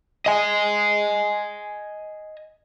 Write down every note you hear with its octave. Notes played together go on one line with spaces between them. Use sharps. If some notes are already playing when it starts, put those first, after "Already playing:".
D#5 G#5